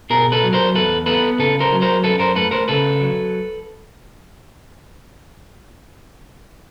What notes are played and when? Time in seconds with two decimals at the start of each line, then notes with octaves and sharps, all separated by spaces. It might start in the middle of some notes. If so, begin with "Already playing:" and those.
0.10 B2 G#4 A#4
0.32 A4 B4
0.43 F#3
0.53 A#4 C5
0.75 E2 A4 B4
1.06 B3 A4 B4
1.39 C#3 A4 B4
1.60 A#4 C5
1.72 F#3
1.82 A#4 C5
2.04 F#2 A4 B4
2.20 A#4 C5
2.35 A3 A4 B4
2.51 A#4 C5
2.68 C#3 A4 B4
3.01 F#3